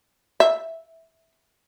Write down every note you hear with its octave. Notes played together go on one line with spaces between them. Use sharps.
E5